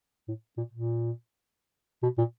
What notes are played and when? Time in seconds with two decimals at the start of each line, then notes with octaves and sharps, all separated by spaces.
0.28 A2
0.57 A#2
0.72 A#2
2.03 B2
2.18 A#2